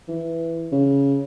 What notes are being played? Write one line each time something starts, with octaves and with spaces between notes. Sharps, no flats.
E3
C#3